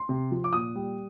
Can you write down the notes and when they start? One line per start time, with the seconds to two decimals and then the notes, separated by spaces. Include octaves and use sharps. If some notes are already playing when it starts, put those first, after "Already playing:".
Already playing: C6
0.09 C3
0.31 F3
0.44 D6
0.53 A#2 D#6
0.75 G3